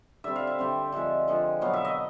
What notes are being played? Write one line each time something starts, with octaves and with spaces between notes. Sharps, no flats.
D3 G3 C4 E5
F5
E5
D3 G3 C4
D3 F3 G#3 E5
D3 F3 G#3
B2 F#3 B3 F5
E5
D#5